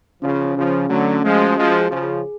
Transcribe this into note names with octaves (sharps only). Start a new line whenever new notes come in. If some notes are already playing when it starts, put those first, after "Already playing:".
C#3 F3 C#4
C#4
C#3 F3
C#4
D3 F#3 A3
C#4
F3 G#3
F#4
F3 G#3 G#4
G#4
C#3 F3
G#4